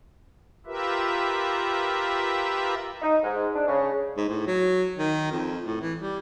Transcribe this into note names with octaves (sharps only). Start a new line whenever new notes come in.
F4 G4 A#4 B4 E5
D#4
G#2
D4
C#3
G#2
A2
F#3
D#3
F2
A2
E3
G3